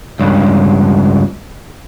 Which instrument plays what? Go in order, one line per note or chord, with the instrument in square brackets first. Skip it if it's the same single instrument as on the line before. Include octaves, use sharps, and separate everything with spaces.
[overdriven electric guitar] C#2 G2